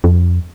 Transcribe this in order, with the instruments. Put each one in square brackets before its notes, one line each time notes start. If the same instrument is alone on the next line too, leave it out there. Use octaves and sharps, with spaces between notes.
[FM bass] F2